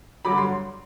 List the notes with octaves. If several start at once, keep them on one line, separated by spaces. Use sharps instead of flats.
G2 D3 F#3 B5 D6
C6